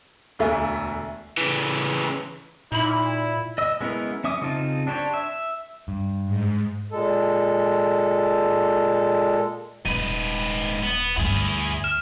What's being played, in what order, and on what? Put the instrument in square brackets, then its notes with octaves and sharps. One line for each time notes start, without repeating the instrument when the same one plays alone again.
[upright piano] E1 D2 A3 E5 G#5
[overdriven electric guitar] C#3 E3
[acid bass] A#2 [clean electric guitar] D#4 E5 B5 [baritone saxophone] E4
[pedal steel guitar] D#5 E6
G#3 B3 C#4 E4 A#4
C#4 E5 D6 D#6
C#3 C4 D#4 F4 A5
D4 G4 C5 C#5
E5
[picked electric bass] G2
[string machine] G#2
[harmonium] A#2 G#3 A4
[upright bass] D#1 [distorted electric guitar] G#2 B4 [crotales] D#7
[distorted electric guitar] B3
[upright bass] D2 G2 [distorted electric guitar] E4 G#4
[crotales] F6 E7